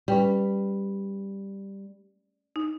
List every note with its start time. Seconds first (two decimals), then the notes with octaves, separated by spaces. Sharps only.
0.08 G3 C#4 B4 G5
2.56 D#4